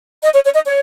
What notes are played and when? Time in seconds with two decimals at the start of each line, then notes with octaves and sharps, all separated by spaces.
0.23 D#5
0.34 C#5
0.44 C#5
0.55 D#5
0.66 C#5